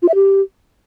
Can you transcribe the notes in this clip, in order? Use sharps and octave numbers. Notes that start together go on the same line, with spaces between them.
F4
E5
G4